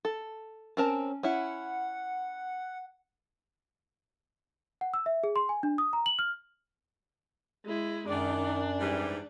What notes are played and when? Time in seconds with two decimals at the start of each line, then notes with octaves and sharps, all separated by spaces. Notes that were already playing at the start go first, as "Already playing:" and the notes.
0.05 A4
0.77 C4 C#4 A#4 A5
1.23 C#4 E4 F#5
4.81 F#5
4.94 E6
5.06 E5
5.24 G#4
5.36 C6
5.49 G#5
5.63 D4
5.78 D#6
5.93 A#5
6.06 F#7
6.19 F6
7.65 G#3 E4
8.08 F#2 D#3 D4 D5
8.80 G#2 E3 G3